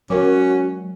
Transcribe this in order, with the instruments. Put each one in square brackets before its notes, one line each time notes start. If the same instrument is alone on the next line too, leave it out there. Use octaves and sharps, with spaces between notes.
[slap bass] F#3 G#3 [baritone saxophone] C#4 [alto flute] F#4 [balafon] A#4 C#5 D6